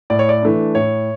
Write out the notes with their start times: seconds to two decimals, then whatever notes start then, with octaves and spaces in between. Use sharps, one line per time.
0.10 A2 D5
0.19 C#5
0.29 D5
0.42 E3 A3 D4
0.75 A2 C#5